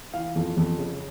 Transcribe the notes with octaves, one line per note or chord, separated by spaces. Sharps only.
E3 F5
F2
F2
C#3